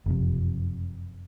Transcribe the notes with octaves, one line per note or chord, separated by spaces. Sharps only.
F#1 F2 C3